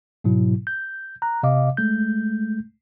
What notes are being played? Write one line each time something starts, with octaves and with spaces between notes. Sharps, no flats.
G#2 B2 F#3 E4
G6
A#5 F#6
C3 D#5 F5 D6
G#3 A3 G6